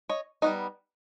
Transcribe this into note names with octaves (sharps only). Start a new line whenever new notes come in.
C#5 D#5
G3 B3 D#4 C#5 D#5